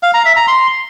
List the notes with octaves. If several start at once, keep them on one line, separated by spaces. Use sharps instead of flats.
F5
A#5
E5
A#5
C6